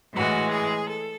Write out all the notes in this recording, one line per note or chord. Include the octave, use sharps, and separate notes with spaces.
A2 E3 G#3 F#4
G#4
A4